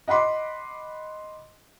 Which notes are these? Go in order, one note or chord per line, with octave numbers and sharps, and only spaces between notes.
D#5 F#5 B5 C6 D6